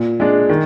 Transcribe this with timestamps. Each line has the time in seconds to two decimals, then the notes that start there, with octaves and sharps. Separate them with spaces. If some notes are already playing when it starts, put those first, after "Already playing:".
Already playing: A#2
0.20 G#3 D4
0.49 D#3